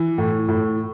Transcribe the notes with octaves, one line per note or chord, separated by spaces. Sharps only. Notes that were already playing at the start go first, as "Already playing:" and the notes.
Already playing: E3
A2
A2